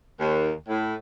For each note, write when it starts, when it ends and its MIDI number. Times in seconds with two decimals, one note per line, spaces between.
0.20 0.54 39
0.69 0.96 45